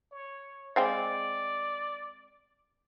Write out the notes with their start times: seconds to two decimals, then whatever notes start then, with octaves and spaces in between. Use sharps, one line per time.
0.12 C#5
0.76 G#3 C4 D5 F5